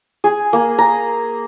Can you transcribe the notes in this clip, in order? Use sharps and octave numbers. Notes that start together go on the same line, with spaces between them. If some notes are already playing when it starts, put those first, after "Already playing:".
G#4
A#3
A#5